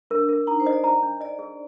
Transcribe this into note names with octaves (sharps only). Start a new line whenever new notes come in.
D4 A#4
A#4
D#4 A#5
C5
D#5
D5
A#5
D4
D5 D#5
G#4